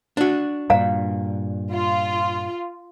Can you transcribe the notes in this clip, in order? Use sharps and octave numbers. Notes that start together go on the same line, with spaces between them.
D4 F#4
G2 A#2 F5 A#5
F4